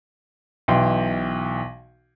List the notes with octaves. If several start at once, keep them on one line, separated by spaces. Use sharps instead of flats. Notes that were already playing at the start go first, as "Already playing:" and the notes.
B1 B2 E3 G5 C6